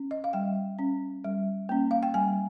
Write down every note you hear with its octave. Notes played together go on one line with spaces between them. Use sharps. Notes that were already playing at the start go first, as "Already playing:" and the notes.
Already playing: C#4
D#5
F5
G3 G5
C#4
G3
A#3 C#4
F5
G5
G3 G#5